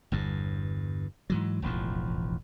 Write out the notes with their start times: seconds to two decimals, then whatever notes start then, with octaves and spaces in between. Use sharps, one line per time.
0.12 G1 E2 G2
1.30 G#2 E3 F#3
1.62 E1 A1 D#2 F3